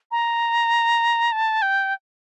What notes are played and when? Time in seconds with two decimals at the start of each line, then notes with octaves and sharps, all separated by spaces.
0.11 A#5
1.32 A5
1.62 G5